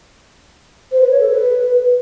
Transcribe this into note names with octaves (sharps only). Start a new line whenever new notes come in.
C5
B4
C#5
A4
B4